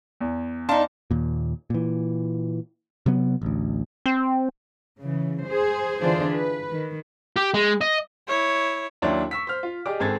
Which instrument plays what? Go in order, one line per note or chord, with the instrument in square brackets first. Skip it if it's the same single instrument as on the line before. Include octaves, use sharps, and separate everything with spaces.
[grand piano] E2
[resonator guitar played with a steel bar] D4 D#4 [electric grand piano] F5 A5 C6
[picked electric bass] D#2 A#2
A#2 E3
C3 F#3 B3
A1 D2
[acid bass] C4
[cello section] C#3 E3
G#4 C5
D3 E3 D4 F4 G#4 C5
B4
D#3
[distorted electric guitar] G4
G#3
D#5
[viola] E4 C#5
[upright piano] D#2 F#3 D4 E4 C#5 C6
C#6 E6 B6
C5 F6
F4
G4 G#4 D5 D#5 D6
G#1 C4 G#4 A4 G#6 A6